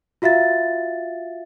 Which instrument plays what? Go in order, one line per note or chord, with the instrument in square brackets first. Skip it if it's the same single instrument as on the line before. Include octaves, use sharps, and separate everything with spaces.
[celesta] F4 F#4 E5 F5 A6